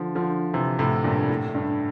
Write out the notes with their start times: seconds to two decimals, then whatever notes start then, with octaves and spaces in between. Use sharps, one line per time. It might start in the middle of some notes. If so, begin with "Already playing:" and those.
Already playing: D3 F3
0.15 D3 F3
0.53 C3 E3
0.79 A2 C3
1.04 G2 A#2
1.29 A2
1.55 G2